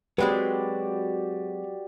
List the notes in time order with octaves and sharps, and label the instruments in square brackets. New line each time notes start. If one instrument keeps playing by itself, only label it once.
[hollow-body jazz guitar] F#3 G#3 C4 [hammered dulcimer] F#4 G4 D5 [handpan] B4